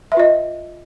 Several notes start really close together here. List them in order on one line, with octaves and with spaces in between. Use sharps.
E5 B4 F4 D#5